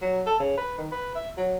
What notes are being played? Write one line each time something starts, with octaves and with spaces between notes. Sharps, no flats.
F#3
A4
C#3
B4
D#3
B4
E5
F#3